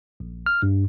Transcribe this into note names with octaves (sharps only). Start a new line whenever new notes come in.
A#1
F6
G2